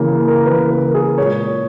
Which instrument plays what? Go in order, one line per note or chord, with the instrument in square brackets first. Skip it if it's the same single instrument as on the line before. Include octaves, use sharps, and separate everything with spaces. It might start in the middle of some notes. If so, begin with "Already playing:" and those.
Already playing: [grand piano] C#3 E3 A#3
A#4
C#3 E3 A#3 B4
A#4
G#4
A#2 G#3 C#5